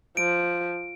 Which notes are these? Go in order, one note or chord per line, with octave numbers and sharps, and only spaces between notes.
F3 D7